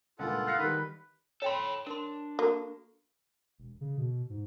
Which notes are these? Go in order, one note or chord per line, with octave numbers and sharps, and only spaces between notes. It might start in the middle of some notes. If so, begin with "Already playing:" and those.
C#2 G2 A#2 F4 A4 F#5
F5 F#6 A#6 C#7
D#3 G3 B4
A4 C#5 G5 B5 C6
D4 A#4 C6
A#3 F#4 A4 C#6
E1
C#3
B2
G#2